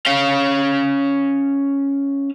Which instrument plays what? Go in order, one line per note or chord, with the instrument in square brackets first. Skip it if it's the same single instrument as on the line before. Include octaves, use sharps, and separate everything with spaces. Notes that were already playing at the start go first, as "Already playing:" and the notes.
[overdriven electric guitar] C#4 F5